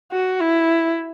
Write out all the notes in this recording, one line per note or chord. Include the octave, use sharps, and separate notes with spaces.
F#4
E4